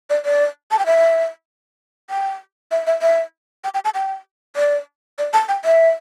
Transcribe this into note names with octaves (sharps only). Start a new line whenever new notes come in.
D5
D5
A5
G5
E5
G5
E5
E5
E5
G5
G5
A5
G5
D5
D5
A5
G5
E5